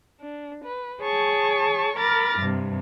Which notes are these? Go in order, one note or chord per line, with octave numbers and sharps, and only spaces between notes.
D4
B4
G#4 C#5 A5 C#6
A#4 B5 D6 F6 A6 A#6
G2 C3